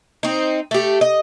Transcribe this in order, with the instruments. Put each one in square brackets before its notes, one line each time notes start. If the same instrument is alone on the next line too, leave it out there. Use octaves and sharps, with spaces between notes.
[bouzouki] C4 D#4
A3 G4
D#5